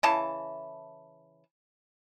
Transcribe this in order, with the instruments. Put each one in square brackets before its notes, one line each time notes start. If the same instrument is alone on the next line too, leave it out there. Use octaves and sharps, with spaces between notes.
[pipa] C#3 E3 A5